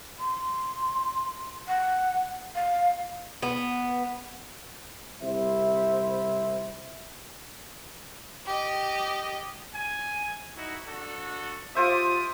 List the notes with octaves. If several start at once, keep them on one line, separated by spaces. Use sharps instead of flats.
C6
F#5
F5
B3
C2 C3 E4 C5 E5
G4 D#5
G#5
D#4 E4 F#4
D4 F#4 A4
F4 G4 C5 E5 D6 D#6